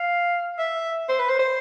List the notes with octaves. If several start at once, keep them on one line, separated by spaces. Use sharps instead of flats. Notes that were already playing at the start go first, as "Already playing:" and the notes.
Already playing: F5
E5
C5
B4
C5
C5